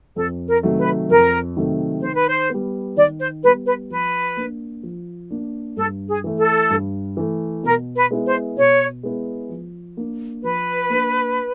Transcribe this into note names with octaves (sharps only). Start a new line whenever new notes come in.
F2 A4
A#4
C3 D#3 F#3 A3
B4
F2 A#4
C3 D#3 F#3 A3
D#3 C5
B4
C5
G3 B3
D#3 D5
C5
G3 B3 B4
B4
F3 B4
A#3 D4
F3
A#3 D4
G2 A4
G#4
E3 A3
A4
G2
E3 A3
B2 A#4
B4
G#3 B3 E4 G#4
C5
B2 C#5
G#3 B3 E4 G#4
F3
A#3 D4
F3 B4
A#3 D4